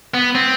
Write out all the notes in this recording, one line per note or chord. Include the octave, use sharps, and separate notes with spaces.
B3
C4